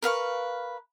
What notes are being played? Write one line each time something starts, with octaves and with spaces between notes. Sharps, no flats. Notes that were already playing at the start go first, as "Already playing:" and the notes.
A#4 B4 F5 C#6